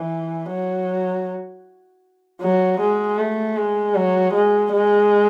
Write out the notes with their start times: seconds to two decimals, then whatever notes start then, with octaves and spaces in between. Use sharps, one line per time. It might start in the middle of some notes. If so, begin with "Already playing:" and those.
Already playing: E3
0.50 F#3
2.42 F#3
2.80 G#3
3.19 A3
3.57 G#3
3.95 F#3
4.34 G#3
4.72 G#3